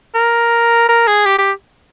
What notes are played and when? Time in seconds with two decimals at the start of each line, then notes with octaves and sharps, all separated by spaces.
0.15 A#4
0.89 A#4
1.08 G#4
1.26 G4
1.39 G4